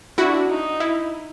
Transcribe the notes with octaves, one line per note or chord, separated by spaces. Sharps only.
D4 E4 F#4
D#4
E4